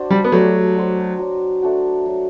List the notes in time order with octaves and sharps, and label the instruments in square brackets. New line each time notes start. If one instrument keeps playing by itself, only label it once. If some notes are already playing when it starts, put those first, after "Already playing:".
Already playing: [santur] D4 F#4 C5
[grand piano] G3
B3
[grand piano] F#3 A3 [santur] G3
[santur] D4 F#4 C5
F#3
A3 D4 F#4
F#3